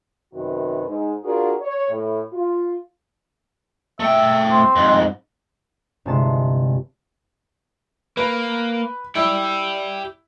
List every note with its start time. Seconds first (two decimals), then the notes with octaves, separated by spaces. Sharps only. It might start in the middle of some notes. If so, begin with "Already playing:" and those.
0.33 F#2 C3 D#3 F#4 B4
0.85 G#2
1.23 D4 F4 F#4 G#4 A#4
1.60 C#5
1.89 A2
2.32 F4
4.00 A3 E5 G5
4.50 C4
4.76 F2 G#2
6.06 G1 C3 G#3 E4 A5 C6
8.17 A#3 B4
9.15 E4 G4 D5